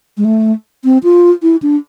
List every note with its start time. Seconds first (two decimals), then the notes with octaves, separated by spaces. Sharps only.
0.17 G#3
0.25 A3
0.84 C4
1.04 F4
1.43 E4
1.62 D4